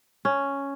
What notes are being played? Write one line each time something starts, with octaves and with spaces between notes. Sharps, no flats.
C#4